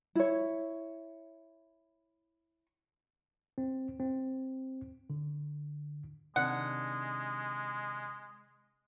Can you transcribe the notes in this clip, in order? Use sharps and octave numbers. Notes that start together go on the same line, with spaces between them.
E4 C#5
C4
C4
D3
C3 D#3 G#3 D4 F#5